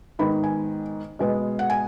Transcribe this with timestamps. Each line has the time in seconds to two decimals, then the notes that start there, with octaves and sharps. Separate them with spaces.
0.19 G#2 D#3 B3 B5
0.44 G#5
1.19 B2 G#3 B3
1.59 F#5
1.70 G#5